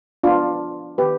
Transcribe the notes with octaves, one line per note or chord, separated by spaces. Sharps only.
F3 G#3 B3 D4 F4
D#3 B3 G4 B4